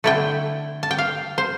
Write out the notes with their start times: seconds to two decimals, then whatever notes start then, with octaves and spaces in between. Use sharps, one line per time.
0.04 D3 A3 E4 G5
0.83 A5
0.91 G5
0.98 F5
1.38 C5